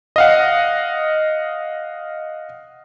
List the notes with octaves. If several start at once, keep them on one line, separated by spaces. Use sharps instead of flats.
D#5 F5 F#5